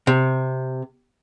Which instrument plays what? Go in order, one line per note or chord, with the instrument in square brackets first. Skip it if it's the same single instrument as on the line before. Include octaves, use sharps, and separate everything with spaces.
[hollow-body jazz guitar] C3